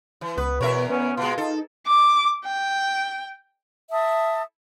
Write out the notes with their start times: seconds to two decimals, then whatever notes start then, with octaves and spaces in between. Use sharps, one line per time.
0.21 E3
0.37 C#2 B3 B4
0.61 E2 B2 A#4 C#5 E5
0.90 B3 C#4
1.17 B2 G#3 F4
1.38 D#4 A4
1.87 D6
2.45 G5
3.91 E5 A5 D#6